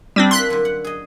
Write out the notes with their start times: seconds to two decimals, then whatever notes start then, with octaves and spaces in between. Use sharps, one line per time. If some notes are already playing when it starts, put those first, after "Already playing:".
0.16 G3 C4 D4
0.31 A#3 E4 C6 F#6 B6
0.50 F#2 D3
0.65 F#5
0.84 G#4 D#5